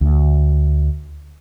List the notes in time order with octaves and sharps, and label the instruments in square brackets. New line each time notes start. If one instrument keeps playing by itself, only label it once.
[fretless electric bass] D2